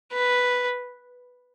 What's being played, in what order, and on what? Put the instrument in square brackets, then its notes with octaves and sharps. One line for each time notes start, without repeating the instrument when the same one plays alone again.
[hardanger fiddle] B4